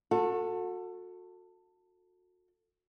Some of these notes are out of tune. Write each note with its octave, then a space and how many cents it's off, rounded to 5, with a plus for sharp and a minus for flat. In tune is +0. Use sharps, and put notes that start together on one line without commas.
F#4 -30 A4 +20